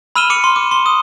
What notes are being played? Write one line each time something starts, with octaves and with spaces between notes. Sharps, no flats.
B5 E6 F6 D#7 E7 G7
D6 C#7 D#7 G7
C6
D6
C6 G7
D#6